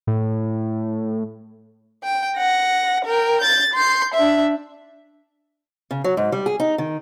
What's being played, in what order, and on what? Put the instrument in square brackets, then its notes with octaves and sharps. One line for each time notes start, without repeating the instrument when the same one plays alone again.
[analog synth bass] A2
[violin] G5
F#5 A#6
A#4 G5
G6 A6
C6 G6
D4 E5
[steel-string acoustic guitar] C#3
F#3
G#2
G3
G#4
D#4
D#3